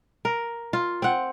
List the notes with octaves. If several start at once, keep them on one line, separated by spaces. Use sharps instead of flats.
A#4
F4
C4 F#5